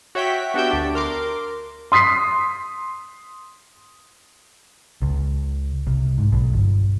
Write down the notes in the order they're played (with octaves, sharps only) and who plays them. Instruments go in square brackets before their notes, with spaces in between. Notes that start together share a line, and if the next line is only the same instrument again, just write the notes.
[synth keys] F#4 C#5 E5 G5 B6
B3 D4 F#4 G4 E5 G5
D2 D4
A#4 C6 D6
[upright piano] C6 D#6 B6 C7
[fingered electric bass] C#2
C2
G#2
B1
G1